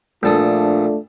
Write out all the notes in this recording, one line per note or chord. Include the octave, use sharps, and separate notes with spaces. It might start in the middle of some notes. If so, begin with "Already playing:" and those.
A#1 A3 D4 F4 A4 D#6